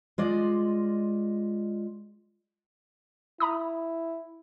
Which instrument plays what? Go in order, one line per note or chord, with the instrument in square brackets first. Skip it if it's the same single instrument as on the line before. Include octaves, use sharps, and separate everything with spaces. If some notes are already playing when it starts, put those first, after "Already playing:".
[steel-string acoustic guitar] G#3 F4 D5 D#5
[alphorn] E4 [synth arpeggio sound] A#5 B5 D#6